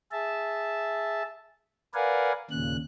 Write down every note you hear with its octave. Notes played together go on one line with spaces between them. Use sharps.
G#4 E5 A5
A#4 B4 D5 F5 F#5 G#5
D#2 A#2 C#3 F#6